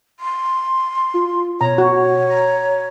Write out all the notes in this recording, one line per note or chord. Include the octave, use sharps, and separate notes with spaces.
C6
F4
B2 C#5 A#5
F#4
A#5